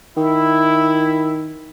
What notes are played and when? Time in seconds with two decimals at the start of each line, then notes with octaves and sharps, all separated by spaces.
0.17 D#3 E4